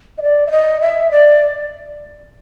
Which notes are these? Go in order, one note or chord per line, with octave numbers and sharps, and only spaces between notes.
D#5
D5
E5
D#5
E5
D5